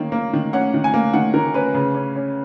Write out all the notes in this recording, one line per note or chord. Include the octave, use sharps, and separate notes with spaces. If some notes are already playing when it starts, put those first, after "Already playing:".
Already playing: D#3 A#3 C#4
A#3
D#3
C#4 F#5
D#3
G#5
A#3
D#3 F#5
D#3 A#4
C#4 B4
C#3
C#4
C#4